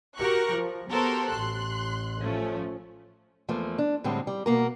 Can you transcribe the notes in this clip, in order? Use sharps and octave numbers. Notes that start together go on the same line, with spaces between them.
F#4 G4 A#4 C#6 F#6
F3
B3 F#4 G4 A4 A#4 C5
A1 C6 F#6
F3 A3 C#4
E2 F3 A3 A#3
D4
A2 D3 G3 G#3 C4
G3
B2 A#3 A#4